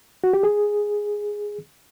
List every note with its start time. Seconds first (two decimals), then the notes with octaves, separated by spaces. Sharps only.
0.24 F#4
0.33 G4
0.43 G#4